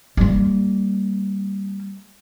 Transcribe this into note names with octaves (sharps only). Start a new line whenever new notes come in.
G3 A#3